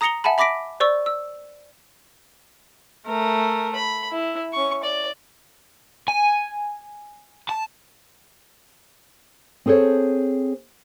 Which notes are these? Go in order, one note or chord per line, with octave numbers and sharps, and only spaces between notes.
A#5 D#6 A#6 C#7 F7 G7
E5 F#5 G#5 A5 B5
E5 B5 D6 A#6 B6 D7
C5 D5 C#6 E6
E6
A3 A#4
B5
E4
C#4 C#6
D5
G#5
A5
C4 G#4 A4 C5 C#5